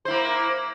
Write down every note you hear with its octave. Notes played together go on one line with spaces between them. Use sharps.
A#3 E4 C5